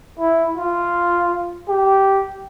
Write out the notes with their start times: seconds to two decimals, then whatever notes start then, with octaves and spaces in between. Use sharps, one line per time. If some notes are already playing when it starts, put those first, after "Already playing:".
0.19 E4
0.56 F4
1.68 G4